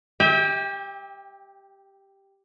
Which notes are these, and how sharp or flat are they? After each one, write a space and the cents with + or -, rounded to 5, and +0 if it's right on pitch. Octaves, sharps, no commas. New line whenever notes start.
G4 +0 E5 -35 G5 +30